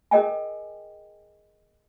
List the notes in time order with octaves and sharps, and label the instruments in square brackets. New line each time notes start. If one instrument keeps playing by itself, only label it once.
[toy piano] G#4 A#4 D#5 G5 G#5